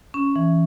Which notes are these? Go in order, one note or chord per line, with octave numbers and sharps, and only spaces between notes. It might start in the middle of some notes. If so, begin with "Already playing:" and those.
C#4
E3